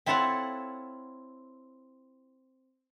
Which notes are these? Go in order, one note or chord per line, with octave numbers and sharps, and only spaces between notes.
C4 E4 F4 A4 C#5 F#5